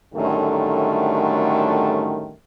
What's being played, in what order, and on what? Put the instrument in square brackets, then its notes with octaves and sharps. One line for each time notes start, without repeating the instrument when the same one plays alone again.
[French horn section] F#2 A2 D3 D#3 G3 A3